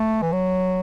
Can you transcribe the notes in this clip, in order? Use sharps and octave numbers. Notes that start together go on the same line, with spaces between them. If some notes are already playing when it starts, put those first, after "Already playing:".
Already playing: A3
E3
F#3